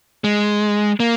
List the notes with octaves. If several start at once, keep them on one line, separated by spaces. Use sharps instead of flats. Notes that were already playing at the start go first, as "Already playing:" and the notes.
G#3
A#3